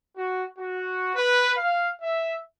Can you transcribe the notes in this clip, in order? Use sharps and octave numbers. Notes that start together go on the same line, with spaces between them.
F#4
F#4
B4
F5
E5